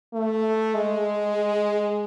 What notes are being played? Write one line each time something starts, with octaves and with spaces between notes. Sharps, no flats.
A3
G#3